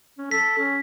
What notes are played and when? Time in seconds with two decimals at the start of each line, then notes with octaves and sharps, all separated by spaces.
0.19 C#4
0.31 A4 B6
0.59 C#4